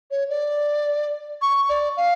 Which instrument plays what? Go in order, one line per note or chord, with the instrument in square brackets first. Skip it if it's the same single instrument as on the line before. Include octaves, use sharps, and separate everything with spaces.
[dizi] C#5
D5
C#6
D5
F5